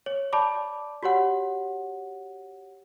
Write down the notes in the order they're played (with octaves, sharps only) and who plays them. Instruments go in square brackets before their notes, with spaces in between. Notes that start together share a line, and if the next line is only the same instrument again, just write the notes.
[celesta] C#5
D5 A5 B5 D6
F#4 G4 C#5 F#5